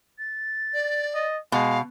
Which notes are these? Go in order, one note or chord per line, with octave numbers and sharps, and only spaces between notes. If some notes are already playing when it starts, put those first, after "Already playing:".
A6
D5
D#5
B2 G#3 F5